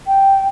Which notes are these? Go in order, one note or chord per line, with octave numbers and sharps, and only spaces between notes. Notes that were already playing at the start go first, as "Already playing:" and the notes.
G5